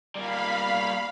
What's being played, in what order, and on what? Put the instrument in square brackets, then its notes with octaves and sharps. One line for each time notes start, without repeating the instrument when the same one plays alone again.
[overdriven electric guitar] G3 A#3 [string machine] F5 B5